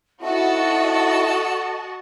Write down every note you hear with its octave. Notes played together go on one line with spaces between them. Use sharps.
C4 D#4 E4 F#4 A4 D#5 E5 A5